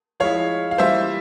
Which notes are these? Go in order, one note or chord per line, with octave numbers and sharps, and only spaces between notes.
F3 G#3 E4 C#5 F5
F5
E3 G3 A#3 F4 C5 E5